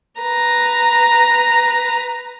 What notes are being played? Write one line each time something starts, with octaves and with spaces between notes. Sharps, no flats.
B4 A#5